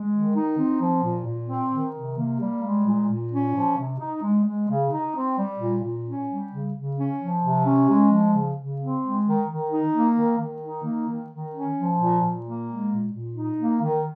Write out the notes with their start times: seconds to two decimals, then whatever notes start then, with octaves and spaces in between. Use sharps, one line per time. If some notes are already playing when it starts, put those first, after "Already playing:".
Already playing: G#3
0.12 D#3
0.34 D#4
0.57 C4
0.79 F3
1.02 A#2
1.25 A#2
1.48 C4
1.71 D#3
1.94 C3
2.17 A#3
2.39 G3
2.63 G#3
2.85 A#2
3.08 A#2
3.30 C#4
3.54 F3
3.76 C3
3.99 D#4
4.21 G#3
4.44 G#3
4.68 C#3
4.91 D#4
5.14 C4
5.36 G3
5.59 A#2
5.82 A#2
6.05 C#4
6.28 G3
6.50 C#3
6.73 C#3
6.96 C#4
7.19 F3
7.41 C3
7.64 C#4
7.87 G#3
8.10 F3
8.33 C#3
8.56 C#3
8.79 C4
9.01 G#3
9.24 D#3
9.47 D#3
9.70 D#4
9.92 A#3
10.15 D#3
10.38 D#3
10.61 D#4
10.84 A#3
11.07 D#3
11.30 D#3
11.53 C#4
11.76 F3
11.99 A#2
12.21 A#2
12.43 A#3
12.66 G#3
12.89 A#2
13.12 A#2
13.35 D#4
13.58 A#3
13.81 D#3